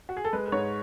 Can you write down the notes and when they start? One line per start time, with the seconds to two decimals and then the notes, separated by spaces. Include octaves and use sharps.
0.09 F#4
0.17 G#4
0.25 A4
0.33 G#3 B4
0.47 B4
0.52 G#2 C#5